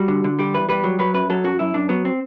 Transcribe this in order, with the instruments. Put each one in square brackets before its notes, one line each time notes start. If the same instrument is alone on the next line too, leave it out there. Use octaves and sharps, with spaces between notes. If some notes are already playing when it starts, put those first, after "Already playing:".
Already playing: [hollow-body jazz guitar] G3 F#4
D3
D3
G3 G4
E2 B4
G3 B4
F#3
F#3 B4
F#2 B4
F#3 A4
F#2 F#4
F#2 E4
F#2 D4
F#3 B3
C4